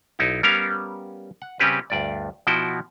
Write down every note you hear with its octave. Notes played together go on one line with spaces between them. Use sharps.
B1 D#4 E4
G3 B3 C#4 A#4 C#5 F5
F#5
C#3 G3 C4 C#4 G4 B4
D2 G2 D5
B2 F3 E4 F#4 G5